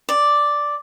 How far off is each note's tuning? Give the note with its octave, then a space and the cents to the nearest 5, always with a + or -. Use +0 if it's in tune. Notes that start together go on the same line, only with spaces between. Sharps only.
D5 +0